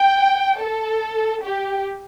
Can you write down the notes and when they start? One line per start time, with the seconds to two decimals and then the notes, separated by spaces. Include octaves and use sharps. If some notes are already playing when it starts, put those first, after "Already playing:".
Already playing: G5
0.60 A4
1.43 G4